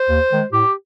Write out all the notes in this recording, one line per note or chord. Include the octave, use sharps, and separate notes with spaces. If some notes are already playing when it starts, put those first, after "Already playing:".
Already playing: C5
D#2
D#3 G#3
A2 G4